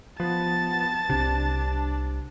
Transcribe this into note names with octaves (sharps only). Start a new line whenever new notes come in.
F3 B3 A5 A6
C2 C3 D4